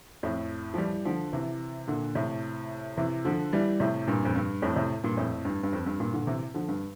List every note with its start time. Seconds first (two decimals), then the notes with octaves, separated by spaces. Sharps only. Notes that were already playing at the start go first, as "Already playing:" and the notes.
0.23 F2 A2
0.74 F3
0.78 E3 G3
1.05 D3 F3
1.33 C3 E3
1.88 A#2 D3
2.15 A2 C3
2.97 C3 E3
3.25 D3 F3
3.53 E3 G3
3.80 A2 C3
4.07 G2 A#2
4.25 F2
4.35 G2
4.62 F2 A2
4.76 A2 C3
5.04 G2 A#2
5.17 F2 A2
5.45 G2
5.63 G2
5.73 F2
5.86 G2
6.00 G2 A#2
6.13 A#2 D3
6.27 C3 E3
6.54 D3 F3
6.68 G2